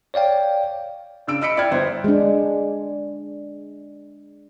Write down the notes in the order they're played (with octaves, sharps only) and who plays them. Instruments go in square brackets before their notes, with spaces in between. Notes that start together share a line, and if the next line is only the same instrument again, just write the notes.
[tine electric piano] C#5 D5 F5 G5
[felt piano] C#3 D4 E6 D7
D#5 B5 E6 B6 C#7 D7
E4 D5 D#5 G5 F6 G#6
G1 B3 C5 E5
[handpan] G#3 D4